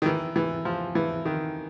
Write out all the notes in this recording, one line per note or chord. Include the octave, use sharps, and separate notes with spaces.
D#3
E3
E3
F3
E3
D#3